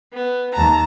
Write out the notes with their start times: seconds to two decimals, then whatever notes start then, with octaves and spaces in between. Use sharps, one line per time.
0.13 B3
0.53 D#2 A5 A#5